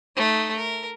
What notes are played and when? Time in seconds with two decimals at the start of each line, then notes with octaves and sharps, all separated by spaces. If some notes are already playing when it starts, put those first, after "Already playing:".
0.16 A3 D#4
0.55 A#4